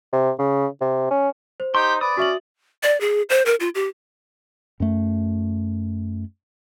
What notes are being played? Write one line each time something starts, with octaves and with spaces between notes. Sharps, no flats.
C3
C#3
C3
C#4
C5
D#4 G4 C6
B4 D5 D#6
C#4 F#4 E5 F#7
D5
G#4
C5
A#4
F4
G4
F#2 A3